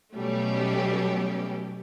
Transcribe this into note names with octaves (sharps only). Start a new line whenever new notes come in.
B2 F#3 G3 A3 C#4 G4